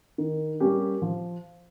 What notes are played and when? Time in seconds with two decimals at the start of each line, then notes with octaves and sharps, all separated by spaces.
0.18 D#3
0.60 G3 A#3 C#4 G4
1.02 F3